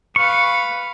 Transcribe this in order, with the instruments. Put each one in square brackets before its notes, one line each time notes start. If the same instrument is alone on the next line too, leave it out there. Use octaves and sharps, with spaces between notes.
[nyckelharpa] B4 F5 [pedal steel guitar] C#6